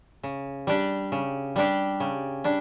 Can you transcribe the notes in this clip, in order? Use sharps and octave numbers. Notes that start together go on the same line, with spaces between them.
C#3
G3 D4 G4
C#3
G3 D4 G4
C#3
G3 D4